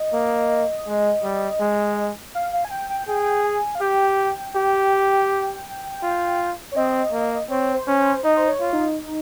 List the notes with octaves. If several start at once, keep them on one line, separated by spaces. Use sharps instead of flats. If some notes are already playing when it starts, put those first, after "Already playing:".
Already playing: D#5
A#3
G#3
G3
G#3
F5
F5
G#5
G5
G5
G#4 G5
G#5
F5
G4 G5
G4
F4
C#5
C4 D#5
A#3
C4 C#5
C5
C#4
C5
D#4 D#5
C5
C#5
F4
D#4